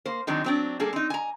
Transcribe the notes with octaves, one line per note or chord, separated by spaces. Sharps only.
A#3 C5
D#3 F#3 G#3 C4 D4 D#4
F#3 C4 D4
G3 A#3 G#4 A4
C4 D#4
G#5 A#5